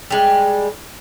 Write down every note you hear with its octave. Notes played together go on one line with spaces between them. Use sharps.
G3 G#3